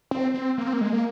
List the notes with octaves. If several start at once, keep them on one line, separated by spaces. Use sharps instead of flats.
C4
C4
A#3
C4
A#3
G#3
A#3